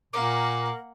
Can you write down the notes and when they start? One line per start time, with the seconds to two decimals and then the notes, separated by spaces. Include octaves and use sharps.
0.13 A#2 A#3 A#4 F#5 D6